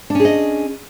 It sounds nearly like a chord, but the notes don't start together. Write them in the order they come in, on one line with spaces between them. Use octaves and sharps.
D4 C#4 G#4 D#5